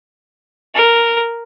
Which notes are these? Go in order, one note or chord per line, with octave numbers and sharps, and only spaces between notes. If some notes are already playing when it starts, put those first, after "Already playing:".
A#4